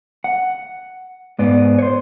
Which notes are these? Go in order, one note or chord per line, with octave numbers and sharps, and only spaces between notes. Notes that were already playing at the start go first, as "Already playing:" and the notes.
F#5
G#2 B3 D5
C5 C#5